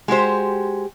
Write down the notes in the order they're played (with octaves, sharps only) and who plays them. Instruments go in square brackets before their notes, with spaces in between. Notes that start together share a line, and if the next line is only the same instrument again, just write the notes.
[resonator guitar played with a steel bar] G#3 F#4 G4 C5